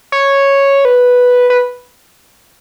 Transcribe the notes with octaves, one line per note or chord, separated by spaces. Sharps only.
C#5
B4
B4